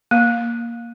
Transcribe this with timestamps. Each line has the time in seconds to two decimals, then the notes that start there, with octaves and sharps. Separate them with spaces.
0.11 A#3